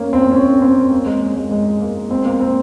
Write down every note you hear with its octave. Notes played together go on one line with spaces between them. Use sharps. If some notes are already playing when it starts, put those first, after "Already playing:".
Already playing: A#3 C#4
C4
C#4
C4
A#3
G#3
G#3
G#3
A#3
C4
A#3
C4